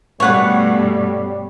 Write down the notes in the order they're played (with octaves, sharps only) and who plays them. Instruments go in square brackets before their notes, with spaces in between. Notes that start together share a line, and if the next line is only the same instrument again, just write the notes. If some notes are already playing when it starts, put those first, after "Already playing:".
[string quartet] G2 B2 [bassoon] G3 [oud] A3 B4 [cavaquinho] C#5 F#5